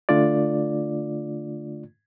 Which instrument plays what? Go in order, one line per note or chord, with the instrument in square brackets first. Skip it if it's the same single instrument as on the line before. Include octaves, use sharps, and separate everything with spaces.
[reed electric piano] D3 A3 D4 F4 D5